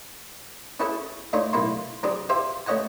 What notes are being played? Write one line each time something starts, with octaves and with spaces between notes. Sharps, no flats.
C#4 E4 F#4 G#4 A4 G#5
A3 D4 D#4 F4 C#5
B1 A2 A#3 E4 G#5 C6
F#3 C4 D4 G4 G#4
F4 G4 C5 E5 F5
A3 C#4 C#5 D#5 F#5 G#5